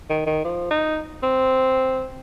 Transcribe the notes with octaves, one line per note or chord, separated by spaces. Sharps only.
D#3
D#3
F3
D#4
C4